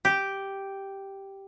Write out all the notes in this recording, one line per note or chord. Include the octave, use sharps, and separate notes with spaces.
G4